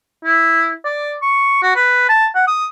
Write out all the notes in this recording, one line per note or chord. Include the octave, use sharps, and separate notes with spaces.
E4
D5
C#6
F#4
B4
A5
F#5
D#6